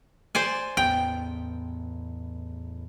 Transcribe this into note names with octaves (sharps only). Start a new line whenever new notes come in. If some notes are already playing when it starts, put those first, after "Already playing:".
C5 D5 G#5
A1 E2 B3 G5